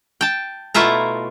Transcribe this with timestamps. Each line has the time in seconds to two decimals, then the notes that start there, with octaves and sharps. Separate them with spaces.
0.21 G5 A5
0.74 B2 A3 E4 F4 E5 A#5